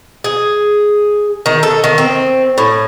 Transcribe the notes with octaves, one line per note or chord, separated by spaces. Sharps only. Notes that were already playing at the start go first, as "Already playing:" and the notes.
G#4
D#3
A4
D#3
C4
A2